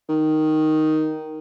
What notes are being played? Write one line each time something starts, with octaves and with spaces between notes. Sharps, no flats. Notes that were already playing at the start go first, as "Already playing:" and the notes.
D#3